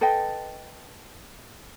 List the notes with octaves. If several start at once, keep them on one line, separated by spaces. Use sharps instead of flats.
A4 B4 D#5 G5